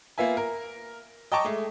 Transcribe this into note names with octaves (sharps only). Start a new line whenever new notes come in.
A#3 B3 F4 E5 G#5
A#4
D#5 G5 A5 A#5 C#6 D6
G#3 A3